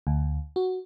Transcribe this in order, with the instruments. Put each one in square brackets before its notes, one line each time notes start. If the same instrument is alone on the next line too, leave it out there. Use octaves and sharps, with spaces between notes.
[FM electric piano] D2
F#4